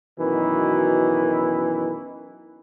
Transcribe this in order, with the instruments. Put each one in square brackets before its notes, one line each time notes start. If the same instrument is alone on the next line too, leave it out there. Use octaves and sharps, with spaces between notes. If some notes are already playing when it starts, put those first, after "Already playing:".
[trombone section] F#2 B2 D#3 E3